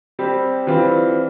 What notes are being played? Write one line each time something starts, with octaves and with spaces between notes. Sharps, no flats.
G3 C4 G4
E3 G3 C4 F4